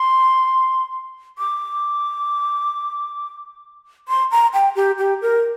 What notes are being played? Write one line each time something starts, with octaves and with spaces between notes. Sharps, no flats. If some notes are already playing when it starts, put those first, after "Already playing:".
Already playing: C6
D6
C6
A#5
G5
G4
G4
A#4